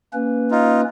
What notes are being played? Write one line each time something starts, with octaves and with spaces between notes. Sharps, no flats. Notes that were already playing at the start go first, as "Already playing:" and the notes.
A#3 C#4 B4
D#4 F4